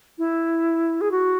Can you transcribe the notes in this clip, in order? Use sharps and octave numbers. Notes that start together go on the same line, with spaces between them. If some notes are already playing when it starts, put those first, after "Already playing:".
E4
G#4
F#4